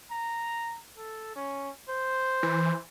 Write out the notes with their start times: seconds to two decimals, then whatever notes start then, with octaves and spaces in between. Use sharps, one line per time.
0.11 A#5
0.97 A4
1.36 C#4
1.89 C5
2.43 E3